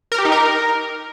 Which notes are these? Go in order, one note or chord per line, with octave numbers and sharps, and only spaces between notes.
A#4
G4
D#4
A#4